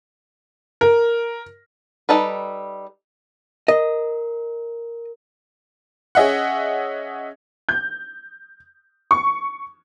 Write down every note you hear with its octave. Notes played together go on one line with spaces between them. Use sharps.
A#4
G3 D#4 A4 B4
A#4 D#5
C#4 G#4 D#5 E5 F#5
G6
C#6